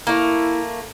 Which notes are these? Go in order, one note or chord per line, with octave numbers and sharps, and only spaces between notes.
A3 A#3 E4